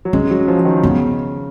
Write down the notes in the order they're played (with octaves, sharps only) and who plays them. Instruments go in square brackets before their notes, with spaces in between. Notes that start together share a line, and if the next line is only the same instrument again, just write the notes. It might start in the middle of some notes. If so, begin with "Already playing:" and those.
[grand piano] F#3
[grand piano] G#3 [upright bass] C#4
[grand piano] F#3
F3
F3
D#3
[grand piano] C#3 [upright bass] B3